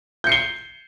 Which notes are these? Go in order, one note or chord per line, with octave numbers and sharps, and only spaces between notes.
G6 C7 C#7 G7